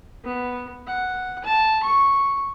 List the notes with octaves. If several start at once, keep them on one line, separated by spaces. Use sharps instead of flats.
B3
F#5
A5
C#6